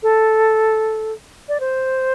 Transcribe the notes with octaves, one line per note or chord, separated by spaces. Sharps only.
A4
D5
C5